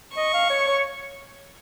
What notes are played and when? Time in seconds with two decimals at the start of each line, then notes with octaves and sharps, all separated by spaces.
0.16 D#5 C#6
0.34 F5
0.50 C#5
0.68 C#5